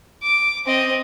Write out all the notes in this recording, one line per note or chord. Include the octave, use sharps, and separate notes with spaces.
D6
C4 D#5